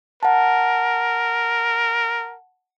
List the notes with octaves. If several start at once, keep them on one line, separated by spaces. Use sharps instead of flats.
A#4 F#5 A5